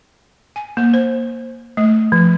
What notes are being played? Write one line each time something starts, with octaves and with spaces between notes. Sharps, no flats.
G#5
A#3
C5
A3
F3